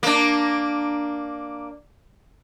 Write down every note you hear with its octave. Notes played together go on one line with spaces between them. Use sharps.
A#3 D4